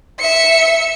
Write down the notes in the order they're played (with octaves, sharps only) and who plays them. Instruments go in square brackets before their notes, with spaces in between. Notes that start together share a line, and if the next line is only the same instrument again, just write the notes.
[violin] E5 C#7